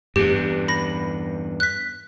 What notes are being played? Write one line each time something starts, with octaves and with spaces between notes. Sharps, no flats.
E2 G2 G4
B5 A#6
F#6 B6